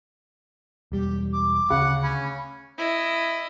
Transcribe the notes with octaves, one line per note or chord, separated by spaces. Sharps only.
E1 G3 G4
D6
D2 C#3 F#5
C#4 B5
E4 D#5